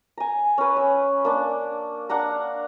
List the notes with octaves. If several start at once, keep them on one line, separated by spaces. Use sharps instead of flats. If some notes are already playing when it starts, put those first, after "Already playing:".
G#5 A#5
C#4 B4
E6
A#3 D4
D4 F5 F#5 A#5